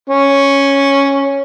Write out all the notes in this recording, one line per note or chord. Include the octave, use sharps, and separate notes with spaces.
C#4